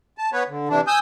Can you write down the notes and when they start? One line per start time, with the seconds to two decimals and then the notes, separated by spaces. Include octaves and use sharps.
0.18 A5
0.33 B3 B4 C#5
0.49 D3
0.69 C3 E3 D4
0.87 G#5 D#6 E6 G6